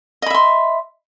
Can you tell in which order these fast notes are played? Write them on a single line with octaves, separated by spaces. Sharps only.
D#5 B5 E5 C6